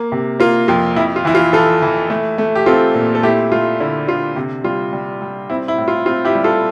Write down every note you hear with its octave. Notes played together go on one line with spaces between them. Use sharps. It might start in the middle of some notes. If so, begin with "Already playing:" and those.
Already playing: A#3
C3
A#3 F4
F2 F4
F2 E4
F4
E3 E4
F4
E3 F4 A4
E3
A3
A3
G4
C4 F4 A4
A#2
A4
A3 E4 G4
A3 F4
D3 E4
D3 F4
C3
G3 F4
G3
G3
C4 E4
E4
A2
F4
C4 F4
E4 G4
G3
F4 A4